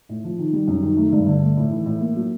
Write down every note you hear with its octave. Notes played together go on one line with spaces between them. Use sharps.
A2
F3
D#3
G3
F#2
D#3
A3
G2
D3
A3
A2
E3
A2
A#3
F#3